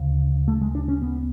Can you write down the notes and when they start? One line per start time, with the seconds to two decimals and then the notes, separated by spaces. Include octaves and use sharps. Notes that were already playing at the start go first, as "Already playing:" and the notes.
Already playing: D2 C#3
0.48 A3
0.62 G#3
0.75 D4
0.88 C#4
1.02 B3